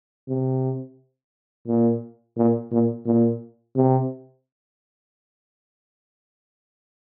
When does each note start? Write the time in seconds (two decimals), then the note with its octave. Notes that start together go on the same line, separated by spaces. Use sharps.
0.29 C3
1.68 A#2
2.37 A#2
2.72 A#2
3.06 A#2
3.76 C3